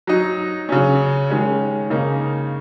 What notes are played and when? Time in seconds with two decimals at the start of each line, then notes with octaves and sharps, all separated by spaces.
0.07 F#3 D#4
0.69 C#3 F#3 C#4
1.30 D#3 G#3 C#4
1.90 C#3 A#3 D#4